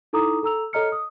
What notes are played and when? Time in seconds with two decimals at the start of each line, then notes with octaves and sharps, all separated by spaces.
0.13 D#4 E4 A4 A#5 D6 D#6
0.43 A4 A#5 E6 F7
0.73 A4 C#5 D#5 A#5 F6 C#7
0.92 D#6